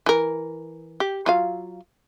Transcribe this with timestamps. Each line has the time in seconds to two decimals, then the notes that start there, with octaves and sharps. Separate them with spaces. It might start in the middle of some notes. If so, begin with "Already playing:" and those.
0.06 E3 A#4
1.00 G4
1.26 F#3 F4 F5